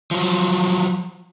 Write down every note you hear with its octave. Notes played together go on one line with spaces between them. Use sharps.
F3 F#3